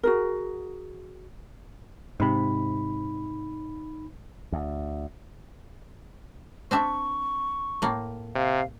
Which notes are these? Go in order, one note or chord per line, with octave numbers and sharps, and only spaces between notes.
F#4 G#4 A#4
G#2 C3 D#4 B5
D2
C4 D4 E5 C#6
A2 A#3
C3 F5